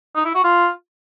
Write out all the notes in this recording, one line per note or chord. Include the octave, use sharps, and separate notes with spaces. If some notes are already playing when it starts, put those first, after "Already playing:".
D#4
E4
F#4
F4